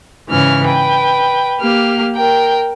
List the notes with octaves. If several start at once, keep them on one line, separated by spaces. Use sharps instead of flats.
G#2 C#3 E3 C#4 F6
B4 G5
A#3 G4 F6
A#4 G5